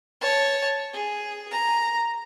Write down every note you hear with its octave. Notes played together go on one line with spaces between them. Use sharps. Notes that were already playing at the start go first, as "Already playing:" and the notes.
C#5 A5
G#4
A#5